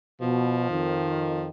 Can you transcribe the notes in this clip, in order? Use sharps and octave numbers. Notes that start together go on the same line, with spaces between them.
B2 F3
F2 D#3